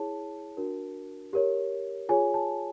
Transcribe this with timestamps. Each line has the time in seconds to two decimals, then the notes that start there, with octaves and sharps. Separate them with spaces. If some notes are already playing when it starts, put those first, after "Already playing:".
Already playing: E4 G#4 C#5 A5
0.57 D4 F#4 A#4
1.33 G4 A#4 C#5
2.09 F4 G#4 C#5 G#5
2.34 A5